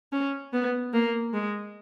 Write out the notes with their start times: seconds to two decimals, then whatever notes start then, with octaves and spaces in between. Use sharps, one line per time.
0.12 C#4
0.53 B3
0.93 A#3
1.34 G#3